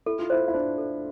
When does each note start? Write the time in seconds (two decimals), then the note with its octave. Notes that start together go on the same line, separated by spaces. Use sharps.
0.06 E4 A4
0.19 F4
0.30 E4 C5
0.48 E4
0.54 D4 C5
0.78 A4